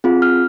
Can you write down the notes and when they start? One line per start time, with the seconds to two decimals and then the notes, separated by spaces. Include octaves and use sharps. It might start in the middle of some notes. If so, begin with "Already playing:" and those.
0.04 C4 F4 G#4
0.22 F6